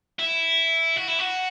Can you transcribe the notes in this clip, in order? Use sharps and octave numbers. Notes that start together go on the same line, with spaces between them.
E4
F#4
E4
F#4